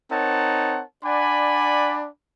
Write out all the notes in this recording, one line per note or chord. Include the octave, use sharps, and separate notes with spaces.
C4 D#4 A#4 C#5 F#5 A5
D4 D5 F#5 G#5 B5